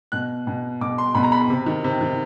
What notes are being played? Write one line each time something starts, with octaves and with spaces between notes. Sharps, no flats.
B2 F#6
B2
B2 D6
C6
B2 B5
A#5
B5
C3
D#3
C3
D#3